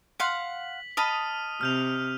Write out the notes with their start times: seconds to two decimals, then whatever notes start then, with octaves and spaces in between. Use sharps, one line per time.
0.20 F5 F#5 C6 B6 F#7
0.97 D#5 A5 B5 D#6 F6 D#7
1.61 C3 F6 G6 F7